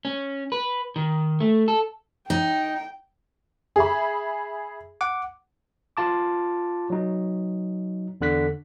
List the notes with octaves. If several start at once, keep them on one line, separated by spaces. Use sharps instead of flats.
C#4
B4
D#3
A3
A4
D#4 G5
G#4 E5 B5
F#5 D6
F4 A5 D6
F#3 D#4
E2 D3 F#6 B6